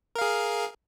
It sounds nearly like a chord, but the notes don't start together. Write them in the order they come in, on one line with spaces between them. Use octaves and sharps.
A#4 F5 G#4